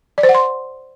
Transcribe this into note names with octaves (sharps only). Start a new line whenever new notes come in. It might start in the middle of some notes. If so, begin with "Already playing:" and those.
D5
C5
F#5
C6